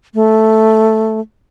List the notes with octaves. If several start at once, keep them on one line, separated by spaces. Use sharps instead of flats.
A3